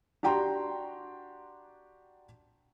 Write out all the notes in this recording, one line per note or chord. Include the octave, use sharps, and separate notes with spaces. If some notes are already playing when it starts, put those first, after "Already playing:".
D4 F#4 G4 G5 A#5 C6